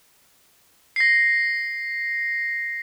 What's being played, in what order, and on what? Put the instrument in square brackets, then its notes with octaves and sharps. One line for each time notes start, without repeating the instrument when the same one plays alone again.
[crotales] A#6 C7